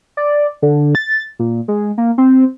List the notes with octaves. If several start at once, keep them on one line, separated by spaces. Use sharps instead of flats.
D5
D3
A6
A#2
G#3
A#3
C4